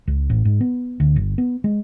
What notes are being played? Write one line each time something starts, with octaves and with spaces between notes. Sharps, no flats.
C#2
A1
G#2
B3
D2
G1
B3
G#3